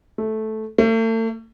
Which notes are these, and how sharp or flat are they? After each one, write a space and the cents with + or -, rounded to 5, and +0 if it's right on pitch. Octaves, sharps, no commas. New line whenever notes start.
A3 -10
A3 +40